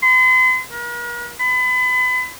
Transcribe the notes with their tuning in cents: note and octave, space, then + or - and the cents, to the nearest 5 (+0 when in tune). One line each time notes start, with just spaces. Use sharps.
C6 -45
A#4 +45
B5 +35